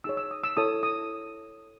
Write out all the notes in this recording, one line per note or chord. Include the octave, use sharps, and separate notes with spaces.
D#4 G#4 C#5 E6
E6
D#6
E6
E4 A4 C#5 D#6
D#6